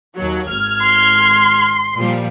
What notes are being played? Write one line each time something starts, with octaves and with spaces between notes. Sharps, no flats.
D#2 F#3
G#1 F6 G#6
C6
A#2 F3 G3